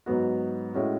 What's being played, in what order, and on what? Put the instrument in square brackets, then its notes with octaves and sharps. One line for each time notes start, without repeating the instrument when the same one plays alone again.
[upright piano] G#2 F#3 B3 F#4
A2 G#3 C#4 F#4